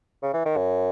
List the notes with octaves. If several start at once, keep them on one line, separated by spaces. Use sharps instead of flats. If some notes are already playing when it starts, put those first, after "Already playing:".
C#3
E3
D#3
F#2